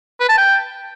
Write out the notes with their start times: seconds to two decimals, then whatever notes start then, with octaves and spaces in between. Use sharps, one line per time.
0.20 B4
0.29 A5
0.38 G5